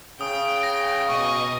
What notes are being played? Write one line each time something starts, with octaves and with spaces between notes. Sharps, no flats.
C#3 G5 D#6
A#6
B2 D#5 C#6